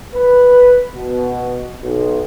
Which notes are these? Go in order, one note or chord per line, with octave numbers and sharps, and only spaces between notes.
B4
B2
B1